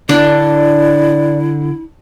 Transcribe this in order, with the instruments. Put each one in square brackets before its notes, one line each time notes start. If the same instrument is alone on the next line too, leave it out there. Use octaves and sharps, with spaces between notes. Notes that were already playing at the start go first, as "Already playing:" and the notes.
[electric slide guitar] D3 [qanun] D4 [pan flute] E4 [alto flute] D5